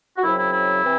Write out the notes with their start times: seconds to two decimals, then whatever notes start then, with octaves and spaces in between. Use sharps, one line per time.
0.17 F#4
0.22 F#2 C#3 F#3 C4 E4
0.37 E4
0.52 E4
0.82 C3 E3 C4